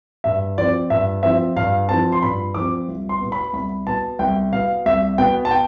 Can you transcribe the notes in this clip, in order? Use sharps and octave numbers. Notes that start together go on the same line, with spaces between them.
G2 E5
F3 C4 D5
G2 E5
F3 C4 E5
G2 F5
F3 C4 A5
C6
G2 B5
F3 C4 D6
C2
C6
B2 B3
B5
C2 B5
B2 B3 A5
C2 G5
B2 B3 F5
C2 E5
B2 B3 G5
A5
G5